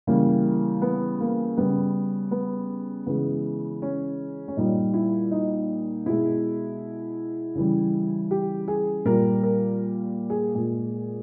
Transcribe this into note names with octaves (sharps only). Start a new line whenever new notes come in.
C#3 E3 G3 A#3
B3
A#3
C#3 G3 B3
B3
C#3 E3 G#3 B3
C#4
C#4
A#2 G3 D#4
E4
D#4
B2 G#3 E4
C#3 E3 G3
G4
G#4
A#2 G3 A#4
A#4
G#4
A#2 G#3 G#4